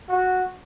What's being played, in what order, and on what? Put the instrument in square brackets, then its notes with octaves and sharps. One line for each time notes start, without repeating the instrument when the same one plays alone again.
[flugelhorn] F#4